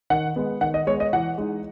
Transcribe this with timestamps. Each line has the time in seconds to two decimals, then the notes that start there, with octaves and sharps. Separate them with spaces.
0.10 D#3 F#5
0.36 G#3 B3
0.61 D#3 F#5
0.74 D#5
0.87 G#3 B3 C#5
1.00 D#5
1.13 E3 F#5
1.38 G#3 D#4